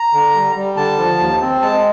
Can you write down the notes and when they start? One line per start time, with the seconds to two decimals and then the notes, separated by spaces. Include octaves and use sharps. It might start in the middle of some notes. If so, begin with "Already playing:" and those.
Already playing: A#5
0.13 D3
0.35 G3
0.56 G3
0.77 D3 A5
0.98 F3
1.19 D#2
1.41 C4
1.62 G#3 A5